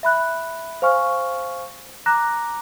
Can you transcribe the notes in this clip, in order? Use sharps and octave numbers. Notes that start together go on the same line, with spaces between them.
E5 B5 F#6
C5 F5 G#5 C#6 F6
A#5 D6 F#6 A#6